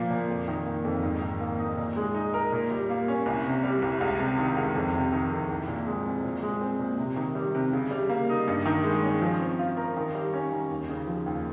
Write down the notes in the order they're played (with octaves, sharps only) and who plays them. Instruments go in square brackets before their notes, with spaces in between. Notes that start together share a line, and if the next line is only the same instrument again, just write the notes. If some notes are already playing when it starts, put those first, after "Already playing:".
Already playing: [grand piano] A#2 F3 A#3
A#2
F2
D#3
A#3
F2
G#2
D#3
A#3
D#4
A#2
G#3
D#4
A#4
A#2
G3
A#3
C#4
C2
C3
G3
C2
C#2
C3
D#3
C#2
F2
C3
D#3
F2
C2
A#2
G#3
C4
A#2
G#3
C4
A#2
C3
D#3
G3
C3
C#3
G3
A#3
D#4
G2
D#3
G#3
C#4
F3
C4
F4
A#4
D#3
G3
C#4
D#3
D#2
C#3
F3
D#2